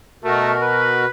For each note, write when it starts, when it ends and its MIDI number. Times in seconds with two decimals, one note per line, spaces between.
0.24 1.05 47
0.24 0.53 57
0.24 1.05 66
0.24 1.05 70
0.62 1.10 71